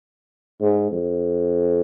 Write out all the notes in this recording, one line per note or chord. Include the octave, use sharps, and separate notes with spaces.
G#2
F2